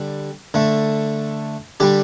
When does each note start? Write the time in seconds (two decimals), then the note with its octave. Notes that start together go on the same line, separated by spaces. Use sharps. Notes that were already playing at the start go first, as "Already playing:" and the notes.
Already playing: D3 G3
0.54 D3 A3
1.80 D3 G3 G4